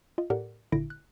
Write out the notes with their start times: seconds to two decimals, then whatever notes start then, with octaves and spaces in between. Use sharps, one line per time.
0.18 F4 D#5
0.30 A2 G4 A4 A#4 D5 F#5
0.72 G#1 A#2 D3 E4 A#6 D7
0.90 F#6